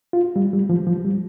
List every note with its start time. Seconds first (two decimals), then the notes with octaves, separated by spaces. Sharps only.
0.13 F4
0.36 G3
0.53 G3
0.70 F3
0.87 F3
1.05 G3